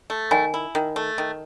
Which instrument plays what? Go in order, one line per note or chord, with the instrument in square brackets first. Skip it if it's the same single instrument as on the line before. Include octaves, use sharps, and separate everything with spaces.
[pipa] A3
[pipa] D#3 [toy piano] G#5
[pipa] E4
D#3
A3
D#3